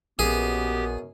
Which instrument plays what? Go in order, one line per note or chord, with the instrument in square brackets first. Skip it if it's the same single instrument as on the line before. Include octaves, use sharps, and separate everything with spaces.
[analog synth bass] A#1 [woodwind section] F#2 B2 B3 [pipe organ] G4 [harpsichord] G#4